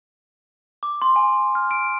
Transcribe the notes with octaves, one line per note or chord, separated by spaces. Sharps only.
D6
C6
G#5
F6
D7